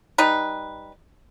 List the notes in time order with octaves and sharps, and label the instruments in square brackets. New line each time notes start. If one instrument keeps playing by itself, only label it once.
[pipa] G3 D#4 B4